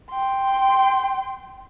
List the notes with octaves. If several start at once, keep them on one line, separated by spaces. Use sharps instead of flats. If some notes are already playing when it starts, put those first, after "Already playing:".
G5 C6